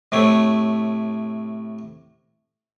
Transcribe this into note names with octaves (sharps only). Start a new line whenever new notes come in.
A2 C3 A3 C#5